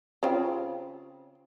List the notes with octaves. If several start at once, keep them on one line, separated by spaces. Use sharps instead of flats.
C#3 C4 F4